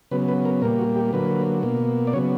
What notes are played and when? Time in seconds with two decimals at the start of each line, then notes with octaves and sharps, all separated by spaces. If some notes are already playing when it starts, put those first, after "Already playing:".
0.11 C#3 F#3 B3 B4
0.28 B4
0.45 A#4
0.62 A#2 G3 A#3 A#4
0.79 F#4
0.96 G4
1.13 D3 F#3 A#3 B4
1.63 B2 A#3
2.07 D5
2.13 C#3 F#3 B3 C#5